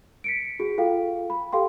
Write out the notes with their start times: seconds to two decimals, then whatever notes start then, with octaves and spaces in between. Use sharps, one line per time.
0.24 B6 C#7 D7
0.60 F#4 G#4
0.78 F4 A4 F5 G5
1.30 B5
1.53 G4 A4 F5 G5 C6